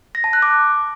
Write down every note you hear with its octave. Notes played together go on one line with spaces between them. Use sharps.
A#6
A5
F#6
D6